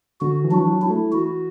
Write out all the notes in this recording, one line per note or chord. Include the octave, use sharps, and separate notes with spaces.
D3 F#4
E3
F#3 D4
E3
F#3
F#3 E4
A3
E3 F#4